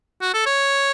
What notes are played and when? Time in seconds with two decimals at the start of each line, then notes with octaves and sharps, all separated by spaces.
0.21 F#4
0.34 A4
0.46 C#5